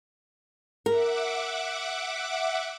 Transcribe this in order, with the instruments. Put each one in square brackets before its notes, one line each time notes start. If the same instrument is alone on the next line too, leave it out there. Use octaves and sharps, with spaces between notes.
[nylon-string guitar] A#4 [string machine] E5 F#5 D6